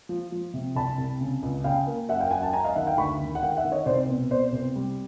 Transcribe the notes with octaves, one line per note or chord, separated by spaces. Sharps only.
F3
F3
C3
C2 A5 B5
C2
C#3
C#2
C#3 F5 G5
A#3
F#2 E5 F#5
F5 G5
F#2 F#5 G#5
G5 A5
F#2 G#5 A#5
D#5 F5
D#3 E5 F#5
F5 G5
D2 B5 C#6
D#3
F#5
D#3 F5 G5
E5 F#5
D#3
C#5 D#5
C2 C5 D5
B2
B2 C5 D5
C2
G3